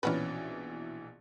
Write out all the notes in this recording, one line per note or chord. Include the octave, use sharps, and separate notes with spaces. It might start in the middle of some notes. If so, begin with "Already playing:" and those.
A#1 B2 E3 C#4 D4 B4